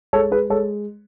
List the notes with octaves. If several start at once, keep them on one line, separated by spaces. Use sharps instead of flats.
G#3 A4 C#5
G#4 B4
G#3 A4 C#5